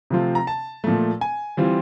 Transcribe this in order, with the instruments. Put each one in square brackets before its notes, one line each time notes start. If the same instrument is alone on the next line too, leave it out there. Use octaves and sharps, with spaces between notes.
[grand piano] C3 F3 A3 C4 F4
A#5
A5
A#2 F3 A3
G#5
E3 G3 C4 F4